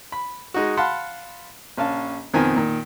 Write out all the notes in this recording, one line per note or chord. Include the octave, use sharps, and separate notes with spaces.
B5
G#3 D#4 F#4
F5 F#5 A5 B5 C6
A#1 C#4 F5 A5
F2 B2 D#3 F3 G#5 A#5
A#2 D#3